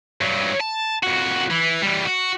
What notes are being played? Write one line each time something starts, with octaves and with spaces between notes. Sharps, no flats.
G2 F#3
A5
F2 F#4
E3
E3 G3
F#4